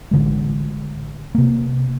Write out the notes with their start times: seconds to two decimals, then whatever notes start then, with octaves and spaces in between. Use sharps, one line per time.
0.11 A1 D3 G#3
1.35 C3 A#3